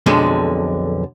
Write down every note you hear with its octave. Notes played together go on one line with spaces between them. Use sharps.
B1 F2 D3 G#3